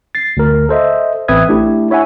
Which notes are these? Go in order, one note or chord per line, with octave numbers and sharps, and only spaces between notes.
A6 C7
D2 A#4
A4 C5 D#5 E5
A1 C4 B4 E5 D#6 G#6
A3 D4 E4 G4
E4 C#5 E5 F#5 G#5